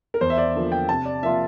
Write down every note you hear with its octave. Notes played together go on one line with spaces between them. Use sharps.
A#4
E2 C5
E5
D5
D3 F3 A#3
G5
C3 A5
D5
F3 A#3 F4 E5